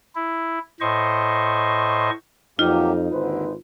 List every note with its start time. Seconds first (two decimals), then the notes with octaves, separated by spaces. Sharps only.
0.15 E4
0.81 A2 C5 D#5 C#6
2.59 F2 F#3 A#3 D#4 F4 G4
3.12 G#1 D#2 D3 B4 C5